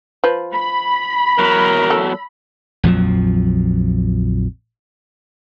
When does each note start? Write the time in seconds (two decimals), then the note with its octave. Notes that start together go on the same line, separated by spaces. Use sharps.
0.24 F3 B4
0.53 B5
1.39 E2 F#3 A#4
1.90 A4
2.83 A#1 F2 F3 F#3